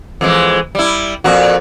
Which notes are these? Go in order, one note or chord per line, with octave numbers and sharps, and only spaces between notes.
F2 E3 G#3
G3 E4
F2 A#2 F#4